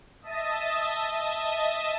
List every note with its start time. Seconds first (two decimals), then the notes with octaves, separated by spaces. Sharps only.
0.22 D#5 E5 A5 D#6